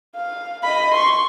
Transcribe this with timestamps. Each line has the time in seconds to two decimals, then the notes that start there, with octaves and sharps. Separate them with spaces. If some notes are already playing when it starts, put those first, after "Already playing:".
0.15 F5
0.63 D#5 B5
0.94 C6 C#6